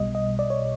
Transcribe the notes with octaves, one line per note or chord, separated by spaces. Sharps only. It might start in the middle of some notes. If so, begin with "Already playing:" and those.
Already playing: B1 B2 G3 D#5
D#5
D5
C#5